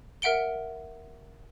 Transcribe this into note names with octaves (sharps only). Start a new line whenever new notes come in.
A#4 E5 F#5 D7 G7